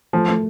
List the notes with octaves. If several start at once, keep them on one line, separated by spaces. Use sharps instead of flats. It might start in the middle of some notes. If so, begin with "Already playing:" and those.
F3 A3
A3